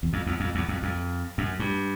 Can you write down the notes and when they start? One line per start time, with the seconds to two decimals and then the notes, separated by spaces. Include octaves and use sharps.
0.03 E2
0.13 F2
0.27 E2
0.40 F2
0.55 E2
0.68 F2
0.83 F2
1.38 F#2
1.59 G2